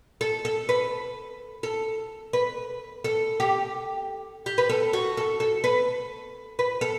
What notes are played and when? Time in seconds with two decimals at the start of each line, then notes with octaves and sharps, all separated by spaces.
0.21 A4
0.45 A4
0.69 B4
1.63 A4
2.33 B4
3.04 A4
3.40 G4
4.46 G4
4.58 B4
4.69 A4
4.93 F#4
5.17 A4
5.40 A4
5.64 B4
6.59 B4
6.81 A4